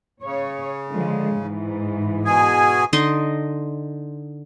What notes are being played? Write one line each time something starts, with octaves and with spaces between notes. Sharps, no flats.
C#3 C#5
D3 F3 G#3
G#2 E3
B2 G#4 G#5
D3 D#4 D#5 C6